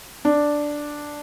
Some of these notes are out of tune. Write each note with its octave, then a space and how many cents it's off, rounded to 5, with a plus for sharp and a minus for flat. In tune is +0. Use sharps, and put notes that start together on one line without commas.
D4 +0